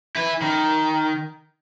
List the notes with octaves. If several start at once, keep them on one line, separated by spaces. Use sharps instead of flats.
E4 B4
D#3